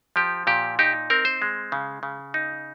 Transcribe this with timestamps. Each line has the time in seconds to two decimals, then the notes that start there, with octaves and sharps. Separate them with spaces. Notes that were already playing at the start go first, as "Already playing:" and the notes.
0.16 F3 G4
0.47 A#2 G4
0.79 D#4 G4
1.10 C4 A#4
1.25 C5
1.42 G#3
1.72 C#3
2.03 C#3
2.34 D#4